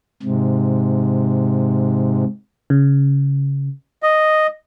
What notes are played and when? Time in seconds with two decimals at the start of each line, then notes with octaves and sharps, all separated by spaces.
0.22 G#2 C3
2.70 C#3
4.03 D#5